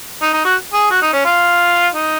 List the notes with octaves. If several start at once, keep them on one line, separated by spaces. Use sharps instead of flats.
D#4
D#4
F#4
G#4
F#4
D#4
C#4
F4
D#4